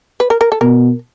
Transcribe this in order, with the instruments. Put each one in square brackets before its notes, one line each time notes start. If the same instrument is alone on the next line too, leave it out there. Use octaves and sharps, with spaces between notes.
[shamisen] B4
A#4
A#4
A4
[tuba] B2 [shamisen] A#4